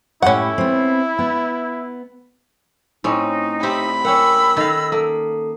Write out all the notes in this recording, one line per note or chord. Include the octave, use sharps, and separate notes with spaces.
A2 G3 C#4 E4 F#5
B3 C4
B3
A2 C4 C#4 D#4
C4 E4 G4 B5
C#4 A#4 F#5 G5 E6
D#3 A4 D#5 F5 A#6
A#3 A4